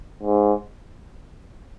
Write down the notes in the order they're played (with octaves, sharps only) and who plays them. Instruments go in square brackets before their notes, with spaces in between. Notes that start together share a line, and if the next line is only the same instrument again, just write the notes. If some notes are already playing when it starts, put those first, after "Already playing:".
[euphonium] G#2